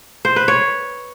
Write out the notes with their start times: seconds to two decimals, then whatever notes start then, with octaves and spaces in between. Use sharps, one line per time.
0.25 C5
0.36 B4
0.48 C#5